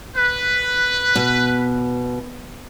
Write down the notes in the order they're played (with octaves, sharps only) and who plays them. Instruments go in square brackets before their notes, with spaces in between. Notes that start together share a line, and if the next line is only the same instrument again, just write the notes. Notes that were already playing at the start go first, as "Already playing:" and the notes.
[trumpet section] B4
[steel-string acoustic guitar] B2